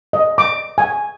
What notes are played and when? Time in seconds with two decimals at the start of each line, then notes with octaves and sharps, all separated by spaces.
0.13 D#5
0.38 D6
0.78 G#5